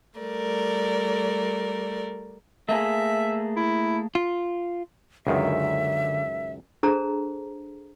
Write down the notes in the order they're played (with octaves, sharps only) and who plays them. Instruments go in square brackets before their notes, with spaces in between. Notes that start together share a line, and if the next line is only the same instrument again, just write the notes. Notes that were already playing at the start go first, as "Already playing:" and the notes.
[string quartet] G3 A3 A#4 D5
[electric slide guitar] A3 A#3 G#4 [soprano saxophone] E5
[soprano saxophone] E4
[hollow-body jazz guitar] F4
[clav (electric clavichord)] C#2 F#2 D#3 [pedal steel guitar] D3 [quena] E5
[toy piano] D4 G#4 A4 C5 A5 A#5